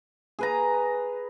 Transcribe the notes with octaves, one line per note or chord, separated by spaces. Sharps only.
G#4 B4 A#5